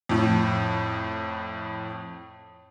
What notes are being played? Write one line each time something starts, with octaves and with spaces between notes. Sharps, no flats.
F2 A2